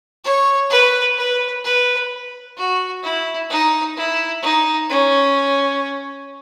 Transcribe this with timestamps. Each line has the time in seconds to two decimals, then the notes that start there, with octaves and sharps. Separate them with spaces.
0.24 C#5
0.70 B4
1.17 B4
1.64 B4
2.57 F#4
3.03 E4
3.50 D#4
3.97 E4
4.42 D#4
4.90 C#4